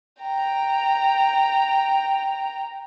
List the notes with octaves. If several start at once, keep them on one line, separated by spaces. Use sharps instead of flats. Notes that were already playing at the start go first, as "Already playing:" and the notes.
G5 A#5